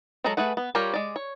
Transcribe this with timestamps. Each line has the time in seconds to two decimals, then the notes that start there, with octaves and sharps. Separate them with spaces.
0.24 F#3 G#3 G#4 A4 A#5
0.37 A3 G#4 B4 F#5
0.57 B3
0.75 G3 F4 G4 A#4 C#5
0.94 G#3 D5
1.16 C#5